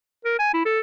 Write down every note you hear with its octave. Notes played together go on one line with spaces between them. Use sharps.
A#4
G#5
E4
A4